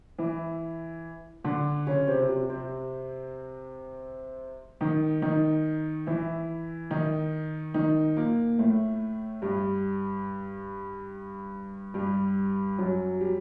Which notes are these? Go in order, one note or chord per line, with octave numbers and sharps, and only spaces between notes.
E3 E4
D3 D4
C#3 C#4
C3 C4
C3 C4
C3 C4
D#3 D#4
D#3 D#4
E3 E4
D#3 D#4
D#3 D#4
A#2 A#3
A2 A3
G2 G3
G2 G3
F#2 F#3
G3